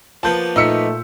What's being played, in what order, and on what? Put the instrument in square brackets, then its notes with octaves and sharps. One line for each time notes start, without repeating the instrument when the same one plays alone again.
[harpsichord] F3 A#3 B3 [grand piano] A5 G6
[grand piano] A#2 B6 [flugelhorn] A3 [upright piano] D#4 E6 C#7